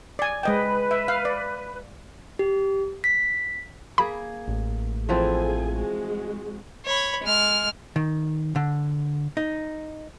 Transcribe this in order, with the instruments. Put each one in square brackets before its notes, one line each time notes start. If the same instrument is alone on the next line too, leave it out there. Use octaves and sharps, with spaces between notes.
[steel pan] D5 G#5
[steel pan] G#3 D#5 G5 [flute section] B4
[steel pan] E5
F5
D5
[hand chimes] G4
B6
[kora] A#3 G#4 [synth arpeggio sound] B5
[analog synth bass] A1
[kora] E3 F3 C4 [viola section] G#4 A4 G#5
[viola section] G#3 F#4
[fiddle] C#5 B5
G#3 F6
[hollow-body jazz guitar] D#3
D3
D#4